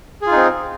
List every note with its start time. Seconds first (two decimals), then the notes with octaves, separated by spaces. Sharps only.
0.22 G#4
0.27 F4
0.31 D#4
0.36 C4